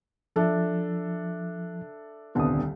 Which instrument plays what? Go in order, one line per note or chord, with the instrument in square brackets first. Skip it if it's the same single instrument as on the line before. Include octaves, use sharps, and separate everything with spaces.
[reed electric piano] F3 [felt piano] D4 A4 E5
[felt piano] D#1 C2 D3 [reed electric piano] B3 D#6